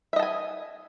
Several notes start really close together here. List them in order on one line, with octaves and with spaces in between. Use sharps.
E5 D#5 A5 G#5